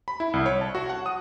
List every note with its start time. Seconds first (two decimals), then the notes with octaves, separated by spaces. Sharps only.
0.08 B5
0.20 E4
0.33 C2
0.46 C#5
0.61 A5
0.75 F#4
0.89 F#5
1.06 D#6